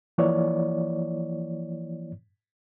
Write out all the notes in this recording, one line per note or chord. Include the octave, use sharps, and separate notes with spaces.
E3 F3 A#3 E4 C#5 D5